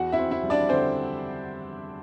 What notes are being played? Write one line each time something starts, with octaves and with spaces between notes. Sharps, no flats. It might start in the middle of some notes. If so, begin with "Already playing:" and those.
Already playing: E2 F#4 F#5
E4 E5
C4
E4 E5
G3
D4 D5
D3 C4 C5